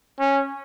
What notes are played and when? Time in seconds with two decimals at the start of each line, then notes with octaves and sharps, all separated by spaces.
0.20 C#4